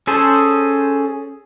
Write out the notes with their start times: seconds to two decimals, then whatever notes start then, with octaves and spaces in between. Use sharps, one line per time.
0.07 C#4 G#4 A4 C5